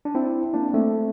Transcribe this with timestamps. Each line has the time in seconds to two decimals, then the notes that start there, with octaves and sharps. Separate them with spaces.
0.05 D4
0.15 C4 E4
0.54 A#3 D4
0.74 A3 C4